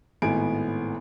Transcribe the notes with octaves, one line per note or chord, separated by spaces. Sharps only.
G#1 A2 B3 G#5 D7